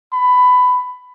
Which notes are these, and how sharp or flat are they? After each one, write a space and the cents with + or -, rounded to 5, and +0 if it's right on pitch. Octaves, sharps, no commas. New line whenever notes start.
B5 +15